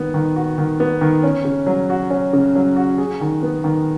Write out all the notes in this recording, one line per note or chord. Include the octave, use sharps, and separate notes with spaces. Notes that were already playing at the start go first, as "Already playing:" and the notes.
Already playing: D#3 B3
D#3
F#4
D#3
B3
D#3
C#4
C#3
F#3
F#4
C#4
C#3
F#3
F#4
G#4
D#3
B3
D#3